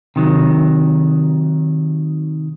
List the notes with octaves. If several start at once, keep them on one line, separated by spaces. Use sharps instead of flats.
C3 D#3 F#3